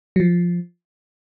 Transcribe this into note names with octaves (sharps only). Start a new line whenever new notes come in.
F#3
F3